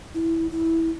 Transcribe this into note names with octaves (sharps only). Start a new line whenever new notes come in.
E4
E4